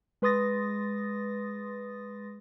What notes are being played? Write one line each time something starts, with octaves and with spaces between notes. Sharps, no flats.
G#3 B4 C6 D#6 A6 A#6